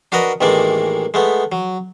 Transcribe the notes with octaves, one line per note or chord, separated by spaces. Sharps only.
D4 F#4 A#4 B4 D#5
A1 D#3 E3 G#3 A#3 D5
G#3 A3 B3
F#3